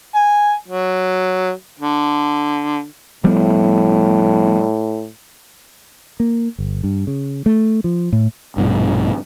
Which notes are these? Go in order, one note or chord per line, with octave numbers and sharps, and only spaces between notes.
G#5
F#3
D3
A2 F3 G3 B3
A#3
G1
G2
C#3
A3
F3
A2
A#1 G2 B2